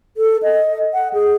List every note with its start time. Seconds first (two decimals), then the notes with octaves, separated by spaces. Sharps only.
0.17 A4
0.42 D#5
0.93 F#5
1.13 G#4